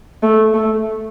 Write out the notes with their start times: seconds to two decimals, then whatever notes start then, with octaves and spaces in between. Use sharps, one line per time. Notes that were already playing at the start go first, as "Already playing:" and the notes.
0.23 A3
0.54 A3